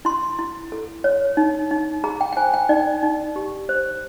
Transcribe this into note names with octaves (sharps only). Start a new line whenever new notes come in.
E4 C6
E4
A4
C#5
D#4
D#4
G#4 A#5
G5
G5
C5 G#5
G5
D#4 D5
D#4
G4
C5